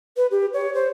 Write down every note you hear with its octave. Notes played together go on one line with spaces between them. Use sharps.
B4
G4
C#5
C5